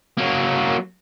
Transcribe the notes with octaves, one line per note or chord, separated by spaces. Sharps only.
F#3 A#3